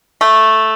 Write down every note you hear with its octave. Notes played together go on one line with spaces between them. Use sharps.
A3